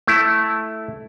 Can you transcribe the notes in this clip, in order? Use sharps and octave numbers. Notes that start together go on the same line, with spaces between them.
A3 E4